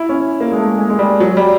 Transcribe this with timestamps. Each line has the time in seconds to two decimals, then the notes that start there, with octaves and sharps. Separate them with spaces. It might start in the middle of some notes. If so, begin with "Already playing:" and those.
Already playing: E4
0.09 C#4
0.41 A#3
0.52 G#3
0.57 A3
0.77 G#3
0.90 G#3
0.99 G3
1.20 F#3
1.37 G3